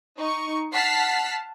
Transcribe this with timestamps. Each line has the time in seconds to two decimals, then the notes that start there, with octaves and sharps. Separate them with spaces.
0.17 D#4 C#6
0.73 F#5 A5 F6 B6 C7